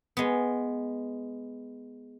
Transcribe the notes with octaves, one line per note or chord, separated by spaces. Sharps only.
G#3 B3